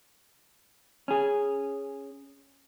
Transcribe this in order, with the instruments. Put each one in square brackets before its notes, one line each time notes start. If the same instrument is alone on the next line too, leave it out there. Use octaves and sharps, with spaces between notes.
[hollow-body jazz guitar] C#4 G#4